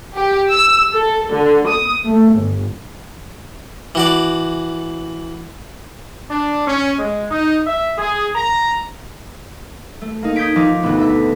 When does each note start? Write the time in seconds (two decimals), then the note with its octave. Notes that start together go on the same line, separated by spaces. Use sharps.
0.16 G4
0.51 E6
0.95 A4
1.33 D3
1.67 D#6
2.07 A3
2.35 G1
3.95 E3 F#4 D5
6.30 D4
6.67 C#4
6.99 G#3
7.31 D#4
7.67 E5
7.98 G#4
8.35 A#5
10.02 A3
10.23 A#3 D#4
10.36 D#6 G6 G#6 B6 D7
10.56 F3 D#4 D6
10.83 D2 B2 B3
10.98 A4 E5